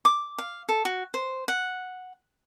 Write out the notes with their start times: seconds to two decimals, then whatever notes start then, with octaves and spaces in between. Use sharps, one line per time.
0.05 D6
0.38 F5
0.69 A4
0.85 F#4
1.14 C5
1.48 F#5